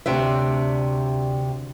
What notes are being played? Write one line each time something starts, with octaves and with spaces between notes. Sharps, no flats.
D2 C3 D4 E5